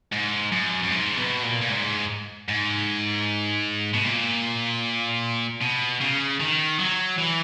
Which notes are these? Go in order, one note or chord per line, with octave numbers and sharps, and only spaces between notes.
G#2
F#2
F#2
G#2
B2
A#2
A#2
G#2
G#2
B2
A#2
B2
C#3
D#3
F#3
E3